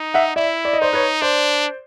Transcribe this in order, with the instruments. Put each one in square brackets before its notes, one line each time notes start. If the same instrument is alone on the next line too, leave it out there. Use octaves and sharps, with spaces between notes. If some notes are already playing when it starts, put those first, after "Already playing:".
Already playing: [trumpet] D#4
[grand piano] E5 F#5
[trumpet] E4 [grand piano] D5 E5
[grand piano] D5
D#5
[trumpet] D#4 [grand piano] C5 D5
[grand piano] B4 C#5
[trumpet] D4 [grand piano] C5 D5